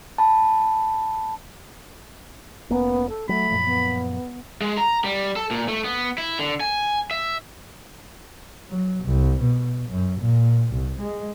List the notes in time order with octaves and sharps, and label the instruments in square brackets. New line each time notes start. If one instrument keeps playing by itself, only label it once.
[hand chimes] A5 B5
[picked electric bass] F1 A#3 C#4 [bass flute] B3
[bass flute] A4
[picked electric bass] F#3 [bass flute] A3 [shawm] B5
[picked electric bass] F#2 A#2 F3
[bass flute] B3
[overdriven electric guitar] G#3
A#5
G3
A4
A#2
A3
B3
E4
D3
G#5
E5
[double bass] F#3
C2
B2
F#2
A#2
C2
G#3